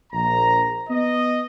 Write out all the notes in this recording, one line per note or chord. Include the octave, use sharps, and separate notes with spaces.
A#1 A#5
B3 D#5